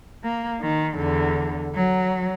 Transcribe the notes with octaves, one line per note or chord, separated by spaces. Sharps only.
A#3
D#3
E2 D3
F#3